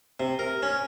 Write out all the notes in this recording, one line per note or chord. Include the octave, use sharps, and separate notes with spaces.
C3
A#4
C#4